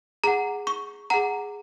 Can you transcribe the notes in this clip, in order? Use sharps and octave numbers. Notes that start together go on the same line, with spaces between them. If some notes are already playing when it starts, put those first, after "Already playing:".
G#4 F#5 A#5
C#6
G#4 F#5 A#5